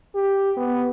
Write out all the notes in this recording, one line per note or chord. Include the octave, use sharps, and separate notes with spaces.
G4
B3